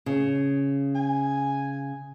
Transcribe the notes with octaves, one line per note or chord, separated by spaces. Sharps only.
C#3
G#5